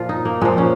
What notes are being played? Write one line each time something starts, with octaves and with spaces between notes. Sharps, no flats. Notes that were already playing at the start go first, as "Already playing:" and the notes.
Already playing: A#2 F3 F4
D#4
A#3
A#2 F3 G#3
C#4